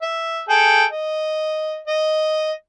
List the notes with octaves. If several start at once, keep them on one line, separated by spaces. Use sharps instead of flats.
E5
G#4 A4 G5
D#5
D#5